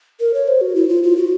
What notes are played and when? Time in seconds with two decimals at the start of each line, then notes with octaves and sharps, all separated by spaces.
0.20 A#4
0.34 C#5
0.48 C5
0.61 F#4
0.75 E4
0.89 F4
1.03 F4
1.17 F#4